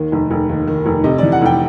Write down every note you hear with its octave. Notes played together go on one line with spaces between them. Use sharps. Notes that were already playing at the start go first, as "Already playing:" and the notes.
Already playing: D#2 D#3
F1
F1
D#2
D#3
F1
C3 D#5
E3 D5
F#5
F1 G5